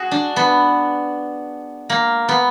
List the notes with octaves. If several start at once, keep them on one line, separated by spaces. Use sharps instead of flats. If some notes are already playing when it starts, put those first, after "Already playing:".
Already playing: F#4 G#4
D4
B3
A#3
B3